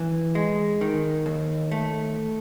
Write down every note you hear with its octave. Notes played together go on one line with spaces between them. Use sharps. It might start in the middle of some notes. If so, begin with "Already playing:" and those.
Already playing: E3
G#3
D#3
D#2
A3